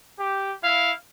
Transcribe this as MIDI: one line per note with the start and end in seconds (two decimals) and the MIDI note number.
0.19 0.52 67
0.63 0.92 64
0.63 0.92 77